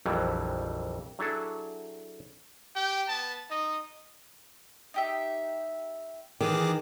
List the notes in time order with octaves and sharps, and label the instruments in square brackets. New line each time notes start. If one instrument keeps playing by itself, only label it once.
[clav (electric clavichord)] A#1 F2 E3 F#3 G3
F#3 D4 E4 G#4 A4
[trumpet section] G4 G5
B3 A5
D#4 D#5
[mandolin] D#4 G4 E5
[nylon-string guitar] D#3 [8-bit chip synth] E3 G#4 D6